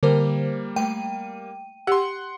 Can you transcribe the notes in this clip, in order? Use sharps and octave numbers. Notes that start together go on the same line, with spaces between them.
D3 G3 A#3 A#4 C5
A3 G5 D#7
G4 F#5 C6